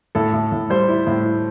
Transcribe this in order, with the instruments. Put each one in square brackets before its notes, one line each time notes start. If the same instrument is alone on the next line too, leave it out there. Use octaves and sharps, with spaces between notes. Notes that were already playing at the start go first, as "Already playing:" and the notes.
[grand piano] A2 A4
A2
A2
G3 C5
E4
A2
E4